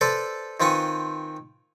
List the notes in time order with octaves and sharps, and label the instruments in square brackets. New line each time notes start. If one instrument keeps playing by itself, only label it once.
[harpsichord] A4 B4 C5 D5
D#3 C4 F4 B4 G#5 C#6